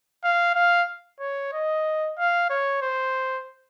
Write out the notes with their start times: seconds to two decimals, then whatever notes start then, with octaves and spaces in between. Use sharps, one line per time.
0.24 F5
0.55 F5
1.20 C#5
1.53 D#5
2.18 F5
2.50 C#5
2.82 C5